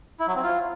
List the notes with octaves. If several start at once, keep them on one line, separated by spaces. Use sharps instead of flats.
E4
F#3
C4
F4